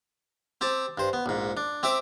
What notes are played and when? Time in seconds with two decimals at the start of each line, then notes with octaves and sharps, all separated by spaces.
0.61 C4 G4 A5
0.98 G2 C5
1.13 B3
1.26 A#1 G#2
1.57 D4
1.83 C4 G4 E5 D6